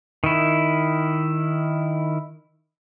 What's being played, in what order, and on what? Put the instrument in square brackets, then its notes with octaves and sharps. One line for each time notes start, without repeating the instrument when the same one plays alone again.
[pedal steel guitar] D#3 E4